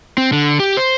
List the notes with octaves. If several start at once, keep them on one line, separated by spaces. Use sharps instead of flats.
C4
D3
G4
C5